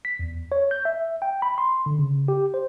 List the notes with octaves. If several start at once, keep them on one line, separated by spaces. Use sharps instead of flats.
B6
E2
C#5
G6
E5
G5
B5
C6
D3
C#3
G4
C5